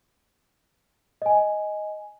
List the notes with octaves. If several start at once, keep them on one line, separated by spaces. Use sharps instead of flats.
D#5 G#5